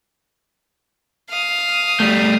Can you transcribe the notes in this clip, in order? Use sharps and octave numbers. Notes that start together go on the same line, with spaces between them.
F5 D#6
G3 A3